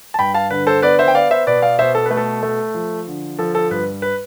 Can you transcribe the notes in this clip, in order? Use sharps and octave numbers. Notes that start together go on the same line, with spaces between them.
A5
G2 G5 B5
F5 A5
D3 B4
A4 C5
B3 B4 D5
C5 E5
G5
B3 D5 F5
C5 E5
B2 B4 D5
D5 F5
B2 C5 E5
A4
A3 B4
A4
A3
F3
D3
F3 A4
A4
G2 B4
B4